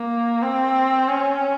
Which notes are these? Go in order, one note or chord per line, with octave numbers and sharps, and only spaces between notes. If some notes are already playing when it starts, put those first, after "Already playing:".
Already playing: A#3
C4
C#4